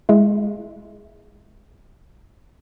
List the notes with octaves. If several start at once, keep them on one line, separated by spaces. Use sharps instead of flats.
G#3 E4